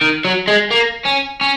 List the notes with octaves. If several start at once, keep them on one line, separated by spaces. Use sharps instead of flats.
D#3
F#3
G#3
A#3
C#4
C#4